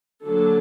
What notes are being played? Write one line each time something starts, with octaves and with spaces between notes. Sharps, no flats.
D3 F#3 A#3 D4 A4